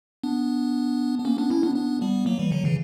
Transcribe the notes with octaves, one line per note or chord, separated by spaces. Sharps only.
B3 D4
B3
A#3 C#4
B3 D4
C#4 E4
B3 D4
B3 D4
G3 B3
F#3 A#3
E3 G3
D3 F#3
C#3 E3